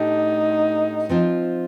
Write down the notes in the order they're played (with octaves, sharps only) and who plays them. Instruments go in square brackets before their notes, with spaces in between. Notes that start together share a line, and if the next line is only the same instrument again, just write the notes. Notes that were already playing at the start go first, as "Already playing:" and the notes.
Already playing: [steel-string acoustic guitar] A2 A3 D4 G4 [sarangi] D#4
[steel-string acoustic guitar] F3 C4 F4